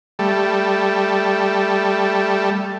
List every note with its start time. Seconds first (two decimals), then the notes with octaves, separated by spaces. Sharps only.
0.19 G3 A3